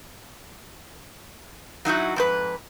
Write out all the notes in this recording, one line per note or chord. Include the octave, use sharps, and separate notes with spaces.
F#3 D#4 E4 F#4
F2 G#2 B4